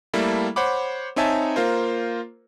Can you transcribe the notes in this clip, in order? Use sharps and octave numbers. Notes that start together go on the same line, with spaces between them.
G3 A3 A#3 E4 A4
C5 C#5 F#5 B5 D6
C4 D#4 C#5 E5 G#5 A5
A#3 F4 A#4 C5